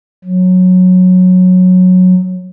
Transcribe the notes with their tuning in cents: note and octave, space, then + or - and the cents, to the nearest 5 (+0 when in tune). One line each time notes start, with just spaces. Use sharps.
F#3 -15